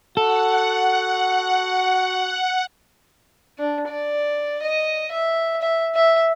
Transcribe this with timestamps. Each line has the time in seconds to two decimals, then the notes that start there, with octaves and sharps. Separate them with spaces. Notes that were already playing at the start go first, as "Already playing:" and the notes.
0.17 F#4 A4 F#5
3.58 D4
3.89 D5
4.63 D#5
5.12 E5
5.61 E5
5.95 E5